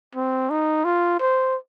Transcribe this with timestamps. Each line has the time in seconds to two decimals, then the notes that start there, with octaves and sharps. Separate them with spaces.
0.15 C4
0.50 D#4
0.85 F4
1.20 C5